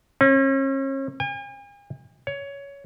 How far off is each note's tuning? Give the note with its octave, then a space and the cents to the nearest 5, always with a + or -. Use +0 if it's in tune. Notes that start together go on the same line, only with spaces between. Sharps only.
C#4 -40
G#5 -45
C#5 +15